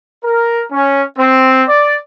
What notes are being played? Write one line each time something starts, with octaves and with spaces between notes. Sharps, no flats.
A#4
C#4
C4
D5